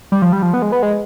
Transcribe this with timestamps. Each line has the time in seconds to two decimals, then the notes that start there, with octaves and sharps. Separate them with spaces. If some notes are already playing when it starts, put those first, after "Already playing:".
0.12 G3
0.22 F3
0.33 G3
0.42 F3
0.54 B3
0.62 G#3
0.72 B3
0.82 G#3